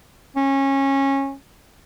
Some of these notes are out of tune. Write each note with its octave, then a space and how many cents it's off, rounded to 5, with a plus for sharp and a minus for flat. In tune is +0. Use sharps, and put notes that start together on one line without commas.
C#4 -20